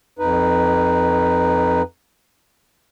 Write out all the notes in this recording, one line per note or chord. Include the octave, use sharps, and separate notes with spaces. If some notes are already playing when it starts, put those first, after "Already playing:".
F2 D#4 B4